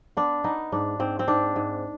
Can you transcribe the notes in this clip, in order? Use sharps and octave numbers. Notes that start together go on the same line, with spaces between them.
B3 D4
B3 D#4
G#2 D4
G#2 C4
C4
G#2 D4
G#2